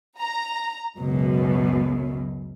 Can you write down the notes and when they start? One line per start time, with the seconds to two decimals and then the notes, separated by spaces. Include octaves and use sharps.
0.18 A#5
0.96 C#2 F#2 B2